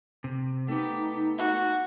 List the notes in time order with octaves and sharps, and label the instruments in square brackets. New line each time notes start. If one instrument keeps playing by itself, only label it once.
[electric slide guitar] C3
[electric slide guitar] A3 B3 [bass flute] D#4 [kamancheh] G4
[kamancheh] F#4